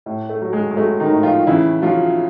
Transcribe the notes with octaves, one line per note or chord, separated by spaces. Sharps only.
A2
A3
F#3
G#3
G#3
F#3 A3
D#3 D#4
A2
F3 F4
C#3 E3 E4
F3 F#3 F4